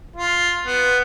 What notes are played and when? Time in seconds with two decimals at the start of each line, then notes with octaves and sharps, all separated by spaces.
0.16 F4
0.66 B3